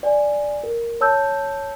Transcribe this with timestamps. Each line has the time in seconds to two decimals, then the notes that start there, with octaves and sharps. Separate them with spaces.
0.03 D5 G#5
0.64 A#4
1.01 C#5 A5 E6 G6